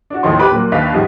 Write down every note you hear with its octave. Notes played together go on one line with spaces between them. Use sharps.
D4 F#4
D#2 A2 F3 D#4 C#5 C6
G4 B4 B5 D6 F#6
A#2 F#3 A#3
D#2 D4 B4 F5 B6
G#2 F3 G3